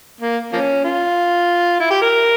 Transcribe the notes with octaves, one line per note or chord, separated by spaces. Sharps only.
A#3
F3 A#3 C#4
F4
E4
G4
A#4